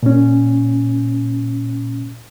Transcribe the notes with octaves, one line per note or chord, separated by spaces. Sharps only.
A#2 C#4